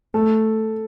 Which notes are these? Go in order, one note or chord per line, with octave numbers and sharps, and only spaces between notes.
A3 A4